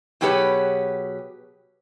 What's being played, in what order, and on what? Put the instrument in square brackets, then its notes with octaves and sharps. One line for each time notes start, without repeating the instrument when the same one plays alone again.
[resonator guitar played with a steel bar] B2 F#3 G4 G#4 B4 C#5